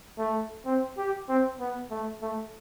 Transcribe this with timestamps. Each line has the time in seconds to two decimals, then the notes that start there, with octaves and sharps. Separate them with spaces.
0.18 A3
0.66 C4
0.97 G4
1.29 C4
1.60 B3
1.91 A3
2.22 A3